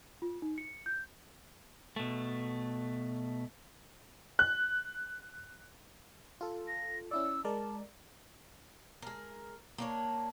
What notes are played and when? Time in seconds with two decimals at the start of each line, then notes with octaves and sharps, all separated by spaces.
0.22 F4
0.42 D#4
0.58 C#7
0.86 G6
1.96 B2 A3
4.39 F#6
6.41 F4 A4
6.68 A#6
7.11 C#4 E4 D5 E6
7.45 G#3 A#4 D5 A5
9.02 G#3 A#4
9.78 A#3 D4 C#5